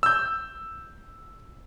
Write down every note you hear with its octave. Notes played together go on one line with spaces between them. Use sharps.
E6 G6